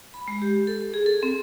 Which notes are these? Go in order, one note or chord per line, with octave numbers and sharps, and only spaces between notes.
B5
G#3
G4
A4
G#4
A4
C4